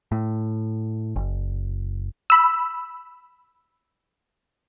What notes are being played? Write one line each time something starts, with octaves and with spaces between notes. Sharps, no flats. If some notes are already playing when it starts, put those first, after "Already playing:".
A2
F#1
B5 E6